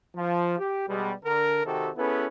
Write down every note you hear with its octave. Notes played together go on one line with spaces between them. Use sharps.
F3
G4
B2 G3 G#3
D3 A#4
C3 D#3 C4 F#4 G4 A4
B3 C#4 E4 G#4 A4 B4